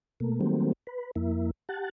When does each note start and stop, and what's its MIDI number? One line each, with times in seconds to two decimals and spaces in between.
0.20 0.40 47
0.20 0.40 57
0.20 0.40 58
0.41 0.73 51
0.41 0.73 54
0.41 0.73 55
0.41 0.73 57
0.41 0.73 58
0.41 0.73 60
0.87 1.11 71
1.16 1.51 41
1.16 1.51 58
1.16 1.51 64
1.69 1.89 67
1.69 1.89 78
1.69 1.89 81